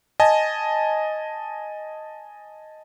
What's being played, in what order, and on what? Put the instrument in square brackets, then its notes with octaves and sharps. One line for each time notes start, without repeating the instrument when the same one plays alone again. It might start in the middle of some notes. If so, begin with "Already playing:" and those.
[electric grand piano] D#5 G#5 A5